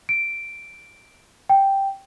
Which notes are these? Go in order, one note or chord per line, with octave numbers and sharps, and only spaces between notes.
D7
G5